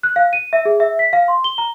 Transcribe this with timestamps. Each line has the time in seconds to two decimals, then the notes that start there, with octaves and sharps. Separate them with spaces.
0.03 F#6
0.16 F5
0.33 D#7
0.53 E5
0.65 G#4
0.80 E5
0.99 B6
1.13 F5
1.28 C6
1.44 G7
1.58 A#5